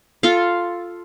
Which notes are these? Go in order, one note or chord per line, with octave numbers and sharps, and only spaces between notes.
F4 A4 F5